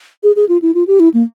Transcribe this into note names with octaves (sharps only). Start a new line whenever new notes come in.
G#4
G#4
F4
E4
F4
G4
E4
A#3